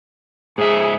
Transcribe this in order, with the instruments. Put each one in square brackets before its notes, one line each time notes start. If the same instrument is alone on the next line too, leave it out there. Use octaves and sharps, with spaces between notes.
[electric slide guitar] G#2 E5 [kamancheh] G#4